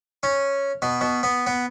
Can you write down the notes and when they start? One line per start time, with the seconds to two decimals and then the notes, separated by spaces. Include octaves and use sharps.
0.23 C#4
0.82 B2
1.01 B2
1.23 B3
1.47 B3